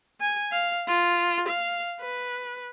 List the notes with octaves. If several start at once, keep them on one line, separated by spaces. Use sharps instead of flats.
G#5
F5
F4
F5
B4